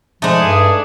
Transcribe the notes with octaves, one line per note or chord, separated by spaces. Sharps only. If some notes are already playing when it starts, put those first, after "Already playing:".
F3 G#3 A3 D4 D#4
G2 G#4